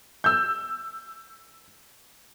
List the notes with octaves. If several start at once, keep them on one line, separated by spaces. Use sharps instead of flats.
E6 G6